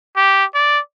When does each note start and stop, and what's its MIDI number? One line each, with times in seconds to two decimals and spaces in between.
0.16 0.45 67
0.55 0.79 74